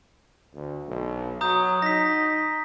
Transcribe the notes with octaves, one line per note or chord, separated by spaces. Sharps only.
D2
B1
F#3 A#5 D#6 G6
D#4 A#6 B6